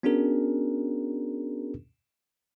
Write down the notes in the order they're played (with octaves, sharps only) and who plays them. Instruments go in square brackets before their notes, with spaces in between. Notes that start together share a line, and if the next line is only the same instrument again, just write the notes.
[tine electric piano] B3 C#4 D4 F#4 G#4 A#4